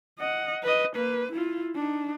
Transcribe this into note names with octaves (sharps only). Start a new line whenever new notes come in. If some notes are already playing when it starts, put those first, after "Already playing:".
D#5 F#5
B4 D#5
A#3 B4
E4 F4
D4 D#4